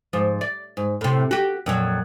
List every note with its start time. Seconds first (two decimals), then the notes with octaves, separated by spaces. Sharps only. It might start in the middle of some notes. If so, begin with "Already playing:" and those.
0.13 G#2 F3
0.41 D5
0.77 G#2
1.01 A2 C3
1.31 F#4 G4
1.66 F2 A#2 F#3